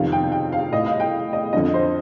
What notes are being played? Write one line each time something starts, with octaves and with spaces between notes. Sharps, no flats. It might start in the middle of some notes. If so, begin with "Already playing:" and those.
Already playing: F2 C3 D#3 F5
G5
G5
F5
A2 D#5
F5
G5
D#5
F2 D3 D#5
C5